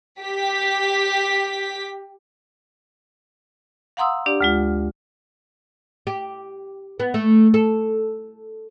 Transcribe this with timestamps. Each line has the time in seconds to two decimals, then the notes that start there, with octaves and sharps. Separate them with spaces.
0.21 G4 B6
3.97 F5 F#5 A#5 C6 D#6 E6
4.26 D4 G4 D5
4.41 D2 G#3 F4
6.07 G4
7.00 B3
7.14 A3
7.54 A4